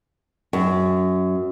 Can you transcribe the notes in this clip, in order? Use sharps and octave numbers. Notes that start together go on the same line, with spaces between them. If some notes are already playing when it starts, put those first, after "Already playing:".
F#2